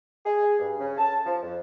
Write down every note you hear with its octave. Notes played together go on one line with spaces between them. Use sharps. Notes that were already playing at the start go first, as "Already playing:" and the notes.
G#4
G2
C#3
A5
F3
F2